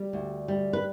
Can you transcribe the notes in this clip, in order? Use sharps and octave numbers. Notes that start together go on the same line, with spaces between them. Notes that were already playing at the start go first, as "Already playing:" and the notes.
Already playing: G3
D2
G3
B4